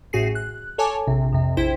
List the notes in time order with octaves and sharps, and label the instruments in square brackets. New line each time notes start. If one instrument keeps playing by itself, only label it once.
[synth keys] A1 A2 F#4 G#4 C7
F#6
A4 C#5 G#5 A5 D6
A#1 C3
F2 C3
A#1 E4 C5 G5 B6